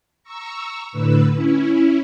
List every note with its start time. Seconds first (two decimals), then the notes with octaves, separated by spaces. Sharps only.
0.23 A#5 C#6 E6
0.92 A2 D3 B4 E6
1.33 C#4 E4